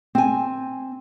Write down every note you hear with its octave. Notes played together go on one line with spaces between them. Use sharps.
C4 G#5